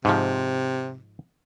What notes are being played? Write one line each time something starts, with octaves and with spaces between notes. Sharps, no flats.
G#2 C3 F3